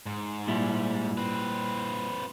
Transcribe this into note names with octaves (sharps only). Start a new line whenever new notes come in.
G#2
A#2 G3 E4
C4 B4